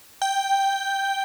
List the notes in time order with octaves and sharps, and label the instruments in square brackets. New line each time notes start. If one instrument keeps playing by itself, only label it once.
[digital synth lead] G5